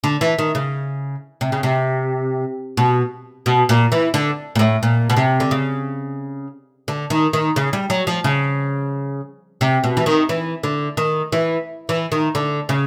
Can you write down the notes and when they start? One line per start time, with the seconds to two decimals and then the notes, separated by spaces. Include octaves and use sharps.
0.04 D3
0.21 E3
0.38 D#3
0.55 C#3
1.41 C3
1.52 C#3
1.63 C3
2.77 B2
3.46 B2
3.69 A#2
3.92 E3
4.14 D3
4.55 A#2
4.59 A2
4.83 A#2
5.10 B2
5.17 C3
5.40 D3
5.51 C#3
6.88 D3
7.10 D#3
7.33 D#3
7.56 C#3
7.73 G3
7.90 F#3
8.07 F3
8.24 C#3
9.61 C3
9.84 B2
9.97 E3
10.06 D#3
10.29 E3
10.63 D3
10.97 D#3
11.32 E3
11.89 E3
12.12 D#3
12.35 D3
12.69 C#3